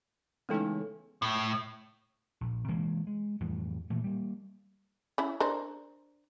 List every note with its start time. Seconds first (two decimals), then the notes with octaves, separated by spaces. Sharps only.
0.49 C#3 E3 G#3 A3 B3 C#4 D#4 A4
1.22 A2
2.41 A#1
2.68 C3 E3 G#3 A#3
3.07 G#3
3.40 F2 A2 E3 G3
3.90 A#2 E3 A3
4.04 G3 A#3
5.18 C#4 E4
5.40 D4 A#4 C5